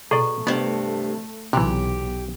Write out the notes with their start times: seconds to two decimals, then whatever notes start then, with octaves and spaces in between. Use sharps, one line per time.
0.11 B2 G#4 A4 D5 A#5 C#6
0.47 G2 C3 A3 B3
1.53 B1 C3 E3 E4 G4 C6